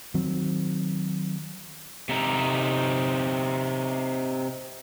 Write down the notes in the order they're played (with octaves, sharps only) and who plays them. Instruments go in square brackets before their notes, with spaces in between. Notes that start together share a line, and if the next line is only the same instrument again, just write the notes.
[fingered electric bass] D#3 F#3 C4
[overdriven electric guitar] C3 D#4